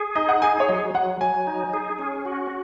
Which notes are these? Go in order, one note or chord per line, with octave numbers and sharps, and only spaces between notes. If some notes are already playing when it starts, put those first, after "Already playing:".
Already playing: G#4
D#4 D#5
F#5
G#4 G#5
C#5
F#3 D#5
F#3 F#5
F#3 G#5
D#4
G#4
C#4
F#4